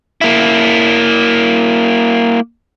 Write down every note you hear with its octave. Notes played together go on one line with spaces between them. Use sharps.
A#3 E4